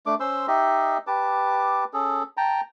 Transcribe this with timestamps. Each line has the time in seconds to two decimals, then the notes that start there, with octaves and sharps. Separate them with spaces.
0.06 A3 D4 D6
0.20 C#4 C5 C6 E6
0.48 D#4 G4 D#5 E5
1.07 G4 B4 A5 D6
1.93 C#4 G#4 A4
2.37 G5 A5 A#5